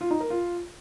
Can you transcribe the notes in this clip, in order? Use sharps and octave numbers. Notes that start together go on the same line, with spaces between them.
F4
D#4
A#4
F4